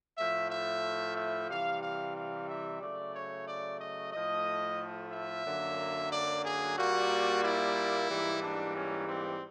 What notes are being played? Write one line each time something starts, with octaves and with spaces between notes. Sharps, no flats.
A2 F3 A3 E5
E5
E5
C3 E3 G3 F5
F5
F5
E5
C#3 F#3 A3 D5
C#5
D5
D#5
A2 F3 A3 D#5
E5
F#2 D3 F#3 A#3
D5
G#4
A#2 G3 A#3 F#4
E4
G#2 E3 G3 A#3
D4
C#4
C4